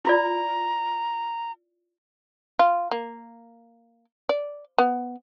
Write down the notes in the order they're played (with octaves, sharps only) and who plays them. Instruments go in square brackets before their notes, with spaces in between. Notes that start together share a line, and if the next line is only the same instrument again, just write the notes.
[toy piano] E4 F4 D5 [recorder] A#5
[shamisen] F4
A#3
D5
B3